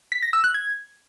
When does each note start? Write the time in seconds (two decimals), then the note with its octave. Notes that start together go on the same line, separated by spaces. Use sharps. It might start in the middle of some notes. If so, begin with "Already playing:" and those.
0.12 B6
0.22 A#6
0.33 E6
0.44 F#6
0.54 G#6